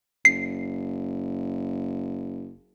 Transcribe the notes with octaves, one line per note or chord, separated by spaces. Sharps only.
F#1 C7